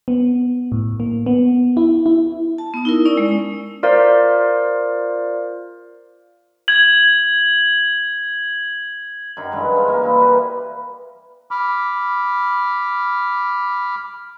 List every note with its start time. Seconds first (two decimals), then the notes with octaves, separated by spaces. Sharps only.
0.08 B3
0.72 A2
1.00 A#3
1.26 B3
1.77 E4
2.06 E4
2.58 A5
2.74 B3 D#6
2.85 D#4 E4 A#4
3.05 C#4 D5 E6
3.17 G#3
3.83 F4 A#4 C5 D5 F5
6.68 G#6 F#7
9.37 F#2 D#4 G5
9.52 G2 E3 G#3
9.72 F3 G#3
9.88 A#3 D#4
10.01 E3 D#4 E4
10.20 G3 A#4 B4
11.51 B5 D6 F6